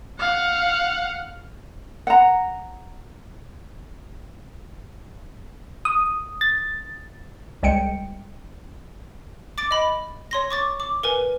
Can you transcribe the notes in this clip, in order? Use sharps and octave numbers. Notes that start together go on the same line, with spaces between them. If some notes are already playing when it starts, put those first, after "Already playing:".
F5 F#5
F#5 A#5
D#6
A6
C2 G#3 G5 C#7 D7
D6 A6 D7
D#5 B5
C#5 C6 A#6
C#6 D6 A6
D6
A#4 B4 G#5